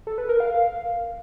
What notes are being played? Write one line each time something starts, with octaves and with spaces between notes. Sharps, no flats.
A4
B4
A#4
F5